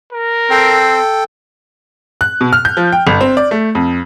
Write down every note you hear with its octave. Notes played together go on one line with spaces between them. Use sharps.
A#4
C4 A4 G5
F#6
B2
F6
G6
F3
G5
G1
C4
D5
A3
F2